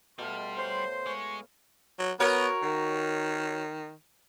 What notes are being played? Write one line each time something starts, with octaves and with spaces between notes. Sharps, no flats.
B2 G3 A3 F5 C6
C5 C#5 B5
G#3 C#6
F#3
B3 F#4 A#4 C#5
D#3